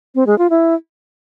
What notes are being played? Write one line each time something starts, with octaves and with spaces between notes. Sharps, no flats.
C4
G#3
F4
E4